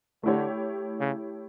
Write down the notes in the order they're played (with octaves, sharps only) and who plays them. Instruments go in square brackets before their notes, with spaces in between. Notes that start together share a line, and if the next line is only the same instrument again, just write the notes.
[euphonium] D3 [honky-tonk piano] A3 E4 G4 C#5
[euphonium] C#3